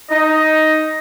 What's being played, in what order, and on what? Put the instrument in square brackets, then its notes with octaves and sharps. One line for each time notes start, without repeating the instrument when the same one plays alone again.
[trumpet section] D#4 [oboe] D#5